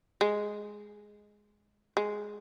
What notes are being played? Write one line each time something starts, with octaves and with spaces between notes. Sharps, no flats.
G#3
G#3